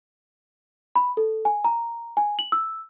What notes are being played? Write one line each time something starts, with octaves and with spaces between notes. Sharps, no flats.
B5
A4
G#5
A#5
G#5
F#7
E6